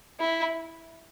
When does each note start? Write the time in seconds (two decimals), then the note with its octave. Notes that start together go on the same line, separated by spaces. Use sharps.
0.20 E4